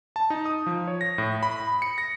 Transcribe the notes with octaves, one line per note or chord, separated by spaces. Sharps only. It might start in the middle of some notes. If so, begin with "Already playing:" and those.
A5
D#4
D#6
F3
C#5
A#6
A2
B5
C#7
A#6